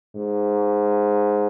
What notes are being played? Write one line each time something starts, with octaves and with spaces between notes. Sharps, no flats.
G#2